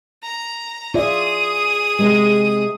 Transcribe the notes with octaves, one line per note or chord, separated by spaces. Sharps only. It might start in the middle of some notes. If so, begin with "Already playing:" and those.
A#5
F4 G#4 D5 E5 D#6
C3 G#3